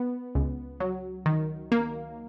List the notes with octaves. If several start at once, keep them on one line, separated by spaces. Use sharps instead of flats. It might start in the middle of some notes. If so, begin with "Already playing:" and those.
Already playing: B3
C#2
F#3
D#3
A#3